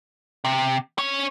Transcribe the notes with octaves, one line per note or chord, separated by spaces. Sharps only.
C3
C#4 C#5